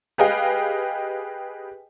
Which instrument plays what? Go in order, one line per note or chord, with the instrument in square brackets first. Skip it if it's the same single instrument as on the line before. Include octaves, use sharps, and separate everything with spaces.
[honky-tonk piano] G4 G#4 B4 D#5 F5 G5